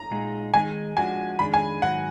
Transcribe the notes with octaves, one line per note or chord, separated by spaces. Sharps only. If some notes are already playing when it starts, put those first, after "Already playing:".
Already playing: A#5
A#2 G#3 D#4 G#4
D#3 G#3 D#4 G#4 G#5
F3 G#3 D4 F#4 G#5
F2 D#3 G#3 D4 G#4 B5
G#5
G#2 D#3 F#3 F#5